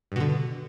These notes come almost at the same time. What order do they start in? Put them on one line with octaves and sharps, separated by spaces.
G2 B2 D3